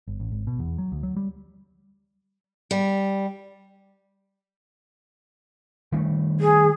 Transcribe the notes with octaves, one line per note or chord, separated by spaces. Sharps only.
G1
A1
G#1
B2
E2
F#3
D2
F#3
G3
G3
D#3 G3 A3
G#4